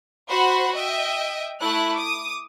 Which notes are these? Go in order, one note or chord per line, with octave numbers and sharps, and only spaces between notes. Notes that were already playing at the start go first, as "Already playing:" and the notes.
F#4 C5 F#5 B5
D#5 E5 G5
A3 E4 F#6
D6 D#6